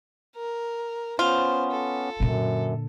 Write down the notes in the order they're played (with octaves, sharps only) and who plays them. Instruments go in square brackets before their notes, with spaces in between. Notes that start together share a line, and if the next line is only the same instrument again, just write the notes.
[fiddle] A#4
[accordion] B3 C#4 [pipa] F4 [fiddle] C5
[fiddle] A4
[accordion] F#2 [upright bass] A#2 D3